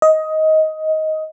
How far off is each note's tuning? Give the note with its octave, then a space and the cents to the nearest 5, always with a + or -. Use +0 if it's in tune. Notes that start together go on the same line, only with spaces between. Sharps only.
D#5 +15